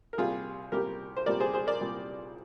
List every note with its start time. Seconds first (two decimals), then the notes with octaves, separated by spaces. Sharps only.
0.13 A#4
0.18 C2 A#2 G3 F4 G#4
0.72 C2 A#2 G3 G4 A#4
1.17 C5
1.26 C2 A#2 G3 A#4 D5
1.40 G#4 C5
1.54 G#4 C5
1.67 A#4 D5
1.81 C2 A#2 G3